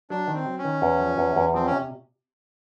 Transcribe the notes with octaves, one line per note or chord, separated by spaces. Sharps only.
F#3 D4
D#3
C4
F#3
C#4
D#3
E2
F3
E2
E2
F3 C4
C#4
C3